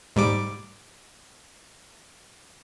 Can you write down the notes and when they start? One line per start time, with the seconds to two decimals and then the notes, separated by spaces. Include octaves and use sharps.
0.16 G#2 G3 D6